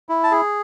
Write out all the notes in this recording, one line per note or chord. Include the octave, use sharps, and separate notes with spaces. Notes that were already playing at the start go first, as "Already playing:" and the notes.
E4
A5
G#4